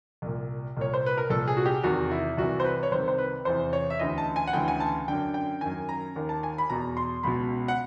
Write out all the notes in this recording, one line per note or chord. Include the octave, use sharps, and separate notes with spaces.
C2 A#2
C2 A#2 C#5
C5
B4
A#4
C2 A#2 A4
G#4
F#4
G4
E2 C3 D#3 F#4
E4
C2 C3 E3 F#4
C5
B4
C#5
C2 C3 D#3 C5
C5
B4
E2 C3 E3 C5
C#5
E5
D2 C#3 E3 D#5
A5
G#5
F#5
D2 C#3 E3 G5
G#5
A5
F#2 D3 G5
G5
F#2 D#3 G#5
A#5
D#2 D#3
A5
G#5
B5
E2 B2 A#5
C6
C#2 B2 B5
F#5